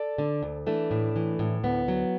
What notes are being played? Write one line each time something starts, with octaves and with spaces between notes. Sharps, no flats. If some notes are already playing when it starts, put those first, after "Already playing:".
Already playing: A4 D5
D3
D2
E3 A3 D4
A2
E3
A2
D2 B3
F#3